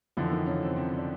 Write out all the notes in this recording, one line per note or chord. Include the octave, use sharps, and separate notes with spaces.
F2 D3 E3 F3 E4
D4
D#3 D#4
C#3 C#4
C3 C4
C3 C4
D4